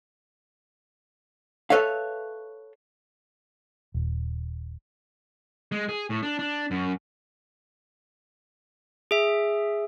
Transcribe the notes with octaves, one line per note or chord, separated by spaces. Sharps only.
A4 B4 C#5 E5 F5
D#1
G#3
G#4
A2
D4
D4
F#2
G#4 E5